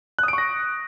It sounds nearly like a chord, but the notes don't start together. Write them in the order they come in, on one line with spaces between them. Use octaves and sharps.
F#6 D#6 D7 C#6 A#6